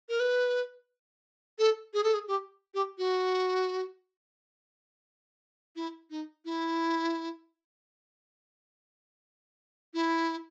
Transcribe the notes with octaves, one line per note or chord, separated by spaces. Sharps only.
A#4
B4
A4
G#4
A4
G#4
G4
G4
F#4
E4
D#4
E4
E4